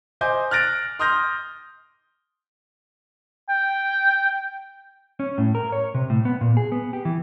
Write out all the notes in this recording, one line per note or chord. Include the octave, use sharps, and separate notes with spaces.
C5 D#5 G#5 D6 G6
F6 F#6 A6 A#6 D7
C6 D#6 F6 G6 A#6
G5
C#4
A2
A#4
C#5
C3
A2
B3
A#2
G#4
B3
G4
E3